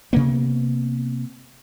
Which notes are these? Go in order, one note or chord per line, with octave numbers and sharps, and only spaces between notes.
C3 A#3 B3